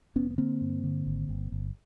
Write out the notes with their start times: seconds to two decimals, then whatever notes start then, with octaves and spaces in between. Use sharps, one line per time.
0.15 F1 B3 C#4
0.30 B3
0.38 D3 A#3 C4
0.61 G2
0.84 D3
1.06 G#1
1.29 G1
1.52 G1